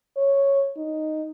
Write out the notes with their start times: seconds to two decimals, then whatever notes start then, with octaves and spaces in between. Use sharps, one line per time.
0.17 C#5
0.77 D#4